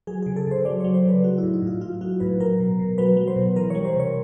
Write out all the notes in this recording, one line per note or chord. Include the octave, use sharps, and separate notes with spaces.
F#3 G#4
C#3 G#4
A4
C#3 C5
F#3 D5
F#3 C#5
C5
C#3 B4
F#3 F#4
E4
A2
D#4
A2
F4
F#3 F4
F#3 F#4
A2 B4
F#3 A#4
B2
B2
F#3 B4
F#3
C5
B2
E3 A#4
G3 C#5
C5
C3
C#5